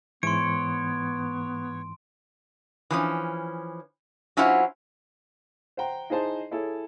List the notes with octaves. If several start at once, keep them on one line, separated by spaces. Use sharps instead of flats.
G#2 E3 B3 C#5 C6 D7
E3 F3 C#4
F#3 C#4 E4 F4 C5 F#5
C5 F#5 G5 A#5
D#4 E4 G#4 C5 A5
E4 G#4 A4 C#5